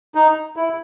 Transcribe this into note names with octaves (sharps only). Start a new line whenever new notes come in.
D#4
E4